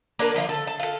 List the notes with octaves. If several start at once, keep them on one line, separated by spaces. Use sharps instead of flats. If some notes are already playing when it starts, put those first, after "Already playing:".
A#3 D4 A#4 B4
D3 F3 D#4 F4
A4
A5
F4 A4